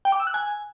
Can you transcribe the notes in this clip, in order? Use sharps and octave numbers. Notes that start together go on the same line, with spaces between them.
G5
D6
E6
F#6
G#5